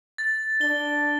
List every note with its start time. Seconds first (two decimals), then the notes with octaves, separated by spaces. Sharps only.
0.18 A6
0.61 D4 G7